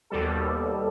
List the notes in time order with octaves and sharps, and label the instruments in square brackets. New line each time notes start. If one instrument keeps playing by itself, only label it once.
[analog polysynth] D#2 B2 G3 A4